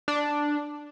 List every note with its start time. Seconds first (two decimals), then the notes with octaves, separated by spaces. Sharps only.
0.08 D4